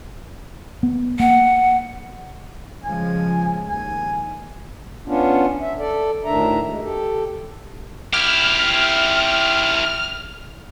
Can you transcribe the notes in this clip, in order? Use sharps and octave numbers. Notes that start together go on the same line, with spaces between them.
B3
A#3 F#5
C#3 F3 G#3 G#5
D#2 G#5
B3 C#4 D4 F4
E5
A4 D5
D2 A2 D#3 D4 E5 A#5
G#3
G4 A4
E4 G4 F6